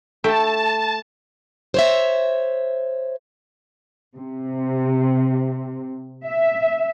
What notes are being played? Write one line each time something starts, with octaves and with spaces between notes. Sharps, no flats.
A3 E5 G5 A5
C5 C#5 E5
C3
E5